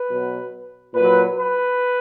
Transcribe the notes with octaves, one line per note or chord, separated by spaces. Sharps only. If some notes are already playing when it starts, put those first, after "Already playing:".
Already playing: B4
B2 F#3
A#2 F#3 B4
B4